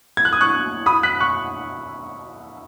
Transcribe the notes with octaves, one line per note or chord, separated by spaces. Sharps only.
G#6
F#6
D#6
C#6 F#6
B5 D#6
F#6 B6
C#6 F#6